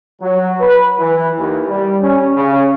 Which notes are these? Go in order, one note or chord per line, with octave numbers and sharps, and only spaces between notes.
F#3
B4
E3
D#2
G3
C#4
C#3